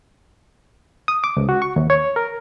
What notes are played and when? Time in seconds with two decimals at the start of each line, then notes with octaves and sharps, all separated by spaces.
1.08 D#6
1.24 D6
1.37 C#2
1.49 F#4
1.62 C#6
1.76 D#2
1.90 C#5
2.16 A#4